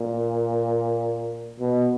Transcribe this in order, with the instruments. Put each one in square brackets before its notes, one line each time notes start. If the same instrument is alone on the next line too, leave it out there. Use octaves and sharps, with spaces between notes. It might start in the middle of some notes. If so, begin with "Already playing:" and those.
Already playing: [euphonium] A#2
B2